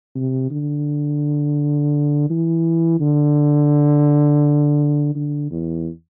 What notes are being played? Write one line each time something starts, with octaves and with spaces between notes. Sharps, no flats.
C3
D3
E3
D3
D3
E2